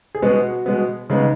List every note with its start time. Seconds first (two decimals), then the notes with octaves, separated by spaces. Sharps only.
0.15 G#4
0.22 B2 G#3 B3 F#4
0.66 B2 G#3 B3
1.10 C#3 G#3 B3 D#4